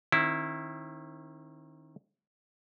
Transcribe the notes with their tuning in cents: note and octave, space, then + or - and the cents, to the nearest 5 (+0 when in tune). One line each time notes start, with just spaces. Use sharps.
D#3 +0 C4 +45 E4 +0